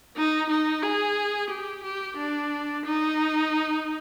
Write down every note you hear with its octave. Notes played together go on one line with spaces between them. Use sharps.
D#4
D#4
G#4
G4
G4
D4
D#4